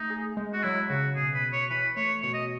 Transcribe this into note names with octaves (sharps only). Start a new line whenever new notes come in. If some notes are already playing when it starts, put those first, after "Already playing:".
Already playing: A3 D#4
G#4
G#3
F#4
F#3 E4
C#3 F#4
B2 G#4
B4
B2
C#5
E3 B4
A3 C#5
B2 C#5
D#5